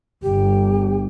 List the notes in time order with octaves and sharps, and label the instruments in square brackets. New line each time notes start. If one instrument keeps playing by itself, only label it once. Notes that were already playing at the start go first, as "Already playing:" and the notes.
[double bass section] G1 [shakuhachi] G4